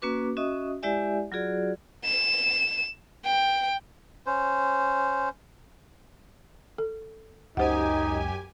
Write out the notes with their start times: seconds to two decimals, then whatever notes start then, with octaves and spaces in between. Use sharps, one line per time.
0.02 A#3 C#4 F#4 B4 D6
0.37 C#4 F#4 D#5 E5 D#6
0.83 G#3 E4 G4 D5 E5 G#5
1.32 F#3 F4 F#4 G#4 D5
2.04 E7
3.25 G5
4.26 C#4 C5
6.78 A4
7.57 C#2 F#2 D#4 G4 C5 F#5 G#5